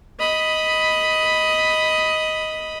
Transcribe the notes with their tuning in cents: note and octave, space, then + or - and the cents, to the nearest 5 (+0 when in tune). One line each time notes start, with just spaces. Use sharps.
D#5 +10 B5 +0